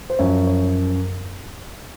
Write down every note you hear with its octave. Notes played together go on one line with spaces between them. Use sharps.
C5
F#2 F3 C#5
C#5